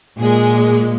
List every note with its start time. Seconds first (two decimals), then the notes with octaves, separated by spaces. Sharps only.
0.18 A#2 G#3 G#4